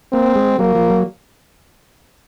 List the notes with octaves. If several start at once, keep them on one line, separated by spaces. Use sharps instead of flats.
A#3 C4
G#3
F#3 A#3
F3
F#3